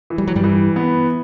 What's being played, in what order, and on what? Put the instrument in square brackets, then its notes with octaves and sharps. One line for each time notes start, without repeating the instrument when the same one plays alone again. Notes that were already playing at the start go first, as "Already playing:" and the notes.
[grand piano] E3
[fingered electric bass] G3
F#3
G2 G3
[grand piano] E3
B3